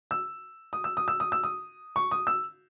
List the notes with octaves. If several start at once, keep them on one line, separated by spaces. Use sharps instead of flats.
E6
D#6
E6
D#6
E6
D#6
E6
D#6
C#6
D#6
E6